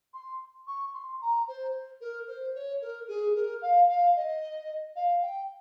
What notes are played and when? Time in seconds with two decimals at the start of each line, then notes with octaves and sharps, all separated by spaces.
0.14 C6
0.67 C#6
0.94 C6
1.21 A#5
1.48 C5
2.01 A#4
2.27 C5
2.55 C#5
2.81 A#4
3.08 G#4
3.35 A#4
3.62 F5
3.88 F5
4.16 D#5
4.96 F5
5.22 G5